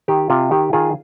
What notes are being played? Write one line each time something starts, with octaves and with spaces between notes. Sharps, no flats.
D#3 G4
C3 F4
D#3 G4
D#3 F4 G#4